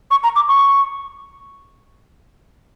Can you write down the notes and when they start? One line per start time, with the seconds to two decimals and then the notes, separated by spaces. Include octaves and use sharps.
0.11 C#6
0.23 A#5
0.36 D6
0.48 C#6